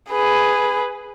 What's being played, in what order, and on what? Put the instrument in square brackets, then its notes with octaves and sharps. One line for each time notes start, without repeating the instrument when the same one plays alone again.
[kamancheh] G#4 B4